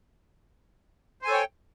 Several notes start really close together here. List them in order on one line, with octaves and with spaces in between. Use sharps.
C5 G#5 A4 C#5 G5